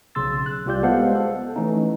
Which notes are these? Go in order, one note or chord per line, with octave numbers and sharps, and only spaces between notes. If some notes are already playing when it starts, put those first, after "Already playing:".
B1 C#3 C6 E6 A6
F#6
C2 G3 F4 G4 D5 G6
G#3 B3 A4 C5 F5 F#5
A4
E3 A3 C#4 D#4